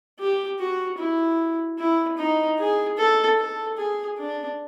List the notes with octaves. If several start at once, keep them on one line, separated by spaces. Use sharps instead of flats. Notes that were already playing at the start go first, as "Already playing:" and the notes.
G4
F#4
E4
E4
D#4
G#4
A4
A4
G#4
D4